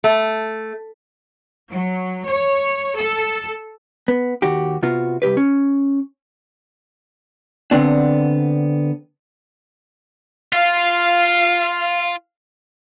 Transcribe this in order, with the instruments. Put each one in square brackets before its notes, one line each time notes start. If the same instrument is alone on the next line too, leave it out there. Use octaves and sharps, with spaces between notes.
[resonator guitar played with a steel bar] A3
[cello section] F#3
C#5
A4
[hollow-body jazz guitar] B3
D#2 F#4 G4
C3 B3 F4 F#4
C2 B2 G4 B4
C#4
D3 B3 C4 D4
[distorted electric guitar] F4 [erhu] F5